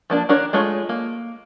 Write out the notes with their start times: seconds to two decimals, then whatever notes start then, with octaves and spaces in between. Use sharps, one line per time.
0.10 F3 A#3 D4
0.29 D#3 D4 A#4 C#5
0.53 G#3 A3 F4 C#5
0.89 A#3